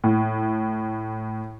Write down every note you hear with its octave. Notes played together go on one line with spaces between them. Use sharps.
A2